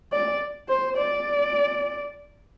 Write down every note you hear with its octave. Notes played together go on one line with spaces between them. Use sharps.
D5
C5
D5